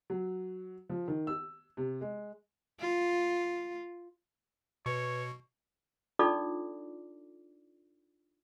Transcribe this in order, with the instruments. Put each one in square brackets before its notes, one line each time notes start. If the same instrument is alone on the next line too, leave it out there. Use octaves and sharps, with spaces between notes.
[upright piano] F#3
F3
D#3
E6
C3
G#3
[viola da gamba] F4
[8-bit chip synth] B2 [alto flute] B4 [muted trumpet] C#5 [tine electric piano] C#6
[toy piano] D4 D#4 F4 A4 D5 D6